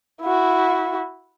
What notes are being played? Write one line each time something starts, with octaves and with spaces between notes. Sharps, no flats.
E4 F#4